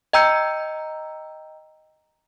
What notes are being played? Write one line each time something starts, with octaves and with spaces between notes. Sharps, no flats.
D#5 G5 A#5 E6 G6 C#7